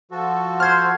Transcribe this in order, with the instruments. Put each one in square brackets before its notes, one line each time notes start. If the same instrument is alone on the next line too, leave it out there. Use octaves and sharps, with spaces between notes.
[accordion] F3 F#4 A4
[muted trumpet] C5 [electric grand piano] F6 G#6